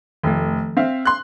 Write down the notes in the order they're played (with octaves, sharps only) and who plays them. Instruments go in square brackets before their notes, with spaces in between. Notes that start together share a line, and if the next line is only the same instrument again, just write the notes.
[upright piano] F1 [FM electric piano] D#3 F3 A3
[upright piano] C4 E5 F5
C6 F#6